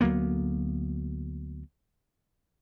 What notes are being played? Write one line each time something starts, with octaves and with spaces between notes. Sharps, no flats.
D2 F#3 A#3 B3